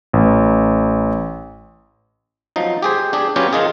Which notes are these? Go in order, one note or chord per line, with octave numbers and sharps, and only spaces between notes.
A1
F3 F#3 D#4
G4 G#4 C5
D4 G4 G#4
F#3 B3 C#4 F4 G4 C#5
D#3 D#4 F4 G#4